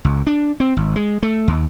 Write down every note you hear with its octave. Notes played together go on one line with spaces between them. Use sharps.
C#2
D4
C4
G#1
G#3
A3
D#2